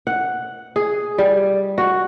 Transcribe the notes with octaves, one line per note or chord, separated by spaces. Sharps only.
F#5
G#4
G3
F#4